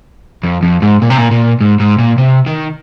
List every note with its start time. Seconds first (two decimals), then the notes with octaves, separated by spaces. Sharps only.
0.44 F2
0.63 F2
0.82 G#2
1.02 A#2
1.10 C3
1.18 A#2
1.31 A#2
1.61 G#2
1.80 G#2
1.99 A#2
2.18 C3
2.47 D#3